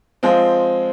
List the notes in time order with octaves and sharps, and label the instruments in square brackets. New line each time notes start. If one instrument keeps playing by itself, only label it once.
[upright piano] F3 G#3 C4